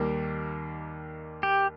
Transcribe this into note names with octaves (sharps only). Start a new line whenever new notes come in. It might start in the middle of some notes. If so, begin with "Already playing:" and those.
Already playing: D#2 D#3 G3 A#3
G4